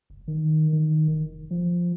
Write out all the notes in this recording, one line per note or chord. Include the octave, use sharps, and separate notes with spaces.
F#1
D#3
D#3
F1
F3